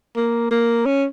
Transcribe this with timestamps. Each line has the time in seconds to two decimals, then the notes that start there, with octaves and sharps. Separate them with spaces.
0.16 A#3
0.51 A#3
0.86 C#4